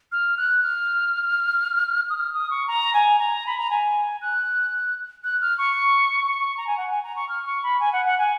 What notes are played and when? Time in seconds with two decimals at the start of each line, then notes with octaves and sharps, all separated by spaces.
0.12 F6
0.38 F#6
0.63 F6
2.10 D#6
2.17 F6
2.34 D#6
2.51 C#6
2.68 A#5
2.94 G#5
3.19 A#5
3.47 B5
3.58 A#5
3.70 G#5
4.22 F#6
5.24 F#6
5.41 F6
5.58 C#6
6.26 C#6
6.57 A#5
6.67 G#5
6.77 F#5
6.91 G#5
7.03 A#5
7.16 C#6
7.29 F6
7.46 C#6
7.63 B5
7.80 G#5
7.93 F#5
8.06 F#5
8.18 G#5